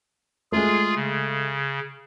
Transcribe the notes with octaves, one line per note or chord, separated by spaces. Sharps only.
G#3 A3 F4 G#4
C#3